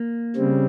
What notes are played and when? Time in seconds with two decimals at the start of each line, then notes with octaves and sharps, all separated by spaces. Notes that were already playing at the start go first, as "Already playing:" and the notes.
Already playing: A#3
0.36 C#3 G3 C4